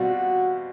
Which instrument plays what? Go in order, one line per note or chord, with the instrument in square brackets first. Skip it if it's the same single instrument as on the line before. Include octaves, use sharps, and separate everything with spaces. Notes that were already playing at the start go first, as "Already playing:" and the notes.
Already playing: [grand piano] B2 G3 C4 F4 [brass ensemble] F#4